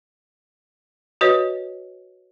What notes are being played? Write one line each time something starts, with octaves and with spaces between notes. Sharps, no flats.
F#4 B4 C#5 D#5